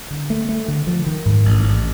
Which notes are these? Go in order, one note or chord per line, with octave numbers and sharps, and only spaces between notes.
D3
A3
A3
D3
F3
D#3
G#2
A1
A1